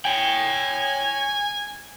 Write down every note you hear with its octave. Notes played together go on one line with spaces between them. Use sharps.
C#5 G5 G#5